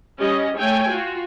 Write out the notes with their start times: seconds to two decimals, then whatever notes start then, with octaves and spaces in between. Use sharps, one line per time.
0.19 G3 C#4 G4 D#5
0.57 A3 C#5 G5 G#5
0.89 F4 F#4